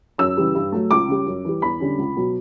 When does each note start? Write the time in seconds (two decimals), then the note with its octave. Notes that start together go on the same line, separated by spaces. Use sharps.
0.18 F#2 E6
0.37 C#3 E3 G3
0.55 G2
0.72 F#3 A3
0.90 C#2 D6
1.08 C#3 G3
1.26 F#2
1.45 E3 G3
1.62 E2 B5
1.80 D3 G3 C#4
1.98 C#2
2.16 B2 F#3